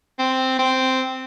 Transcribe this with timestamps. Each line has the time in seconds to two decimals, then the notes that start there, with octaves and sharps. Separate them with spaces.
0.19 C4
0.59 C4